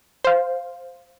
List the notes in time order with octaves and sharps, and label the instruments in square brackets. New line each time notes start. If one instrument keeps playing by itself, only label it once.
[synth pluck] C5 F5